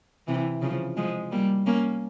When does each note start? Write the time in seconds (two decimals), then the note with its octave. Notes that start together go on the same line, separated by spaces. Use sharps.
0.27 C3 E3
0.62 C#3 F3
0.97 F3 G#3
1.32 G3 A#3
1.66 A#3 C#4